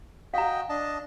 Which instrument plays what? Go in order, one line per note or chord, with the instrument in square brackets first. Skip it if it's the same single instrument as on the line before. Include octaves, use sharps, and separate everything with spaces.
[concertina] F#4 D#5 G5 [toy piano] F5 A#5
[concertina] D4 D#5 A5